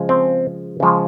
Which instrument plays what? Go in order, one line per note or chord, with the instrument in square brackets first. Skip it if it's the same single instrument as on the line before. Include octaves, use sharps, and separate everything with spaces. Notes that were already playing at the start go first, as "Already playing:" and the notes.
Already playing: [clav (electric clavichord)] C#3 F3 G#3
C4
C#3 F3 G#3